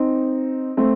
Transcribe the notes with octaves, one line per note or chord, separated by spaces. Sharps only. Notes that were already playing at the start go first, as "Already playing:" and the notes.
Already playing: C4 D#4
A3 C4